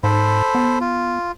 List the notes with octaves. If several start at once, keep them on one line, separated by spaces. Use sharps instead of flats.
G#2 A4 C5 B5
B3
F4